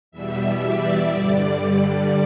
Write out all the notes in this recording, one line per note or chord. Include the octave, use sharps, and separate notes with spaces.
E2 B2 G3 E5
D5
G2 D3 G3
D5